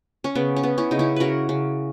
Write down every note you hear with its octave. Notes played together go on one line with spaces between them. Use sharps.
C#4
C#3 B3
C#4
B3
C#4 E4
C#3 D#4
C#4 E4
C#3 F#4 A#4 B4
C#3